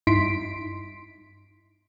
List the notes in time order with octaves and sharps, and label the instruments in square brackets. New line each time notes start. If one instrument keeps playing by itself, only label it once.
[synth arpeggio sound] G2 D#4 E4 C6 B6 D7